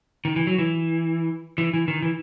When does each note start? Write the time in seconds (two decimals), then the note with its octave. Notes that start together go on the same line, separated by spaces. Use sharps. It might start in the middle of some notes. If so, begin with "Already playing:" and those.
0.25 D#3
0.36 E3
0.47 F#3
0.58 E3
1.58 E3
1.73 E3
1.88 D#3
2.02 E3